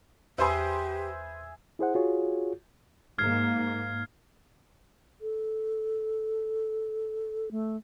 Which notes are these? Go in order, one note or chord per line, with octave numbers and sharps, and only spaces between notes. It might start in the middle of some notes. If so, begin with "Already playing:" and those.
E2 G4 G#4 B4 C5 E5 B5 C6
E4 G#4 C5 F#5
F4 F#4 G#4 C#5
G#2 A#3 F6 G#6 C7
A4
A3